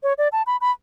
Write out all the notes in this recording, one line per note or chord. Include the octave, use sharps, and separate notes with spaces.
C#5
D5
A5
B5
B5